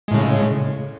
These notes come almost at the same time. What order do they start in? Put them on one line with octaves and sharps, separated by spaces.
G#3 A2 C#3